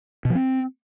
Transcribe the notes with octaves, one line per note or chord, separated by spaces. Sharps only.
B2
F3
C4